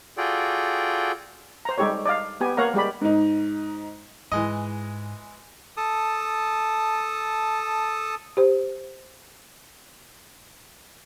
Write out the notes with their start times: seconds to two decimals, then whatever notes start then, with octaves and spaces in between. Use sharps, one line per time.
0.17 F4 F#4 G#4 A4 D5 G5
1.65 C5 A#5
1.78 G3 G#3 D#4 G4 A4 C#5
2.06 D5 D#5 F5
2.40 B3 G4 G#5
2.57 A#3 A#4 C#5 F5 F#5 A#5
2.74 G3 G#3 G4 D5 B5
3.01 G#2 D#4
4.32 G#2 E3 G#3 D#5
5.77 A4 A5 D#6
8.37 G4 C5